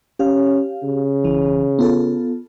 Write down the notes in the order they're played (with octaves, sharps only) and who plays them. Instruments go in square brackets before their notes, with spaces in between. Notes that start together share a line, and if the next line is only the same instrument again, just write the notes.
[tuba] C#4 [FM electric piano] G4 F5
[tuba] C#3
[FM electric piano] B1 E3
B3 F4 A4